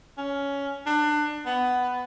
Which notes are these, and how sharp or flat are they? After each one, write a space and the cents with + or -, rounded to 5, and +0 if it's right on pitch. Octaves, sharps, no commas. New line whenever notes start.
C#4 +15
D4 +25
B3 +10